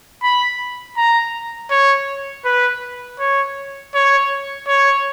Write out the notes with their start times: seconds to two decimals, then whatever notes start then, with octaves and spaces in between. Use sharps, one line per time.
0.23 B5
0.97 A#5
1.71 C#5
2.45 B4
3.20 C#5
3.95 C#5
4.68 C#5